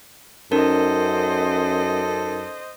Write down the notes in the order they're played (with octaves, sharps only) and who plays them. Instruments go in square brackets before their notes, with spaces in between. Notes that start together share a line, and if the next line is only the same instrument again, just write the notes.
[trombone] F#2 [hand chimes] C#4 D#4 A#4 [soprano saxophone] A4 [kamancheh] C5 D#5